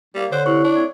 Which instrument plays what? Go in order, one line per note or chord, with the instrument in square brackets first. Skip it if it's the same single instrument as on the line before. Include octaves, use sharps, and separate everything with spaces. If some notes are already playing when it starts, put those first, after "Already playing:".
[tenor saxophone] G3 [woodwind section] A#3
[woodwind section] D3 [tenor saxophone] C5 [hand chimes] C#5 F#6
[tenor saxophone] C3 [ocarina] E4 [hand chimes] C#6
[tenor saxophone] D4
[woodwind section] A3 C4 C#5